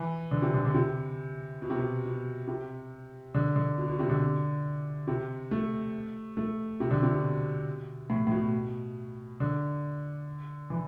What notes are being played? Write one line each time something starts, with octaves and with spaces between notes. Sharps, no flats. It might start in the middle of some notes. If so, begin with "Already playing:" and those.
Already playing: E3
D3
C3
D3
D3
C3
B2
C3
B2
B2
C3
D3
D3
B2
B2
C3
D3
C3
A3
A3
C3
D3
C3
B2
A2
A2
B2
D3
E3